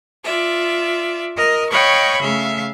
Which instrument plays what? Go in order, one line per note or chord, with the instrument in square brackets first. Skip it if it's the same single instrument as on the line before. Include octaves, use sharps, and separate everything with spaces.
[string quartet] F4 D5 E5
A#4 D#5 F6
C#5 D#5 F5 G5 B5 C#6
C#3 A3 E5 F5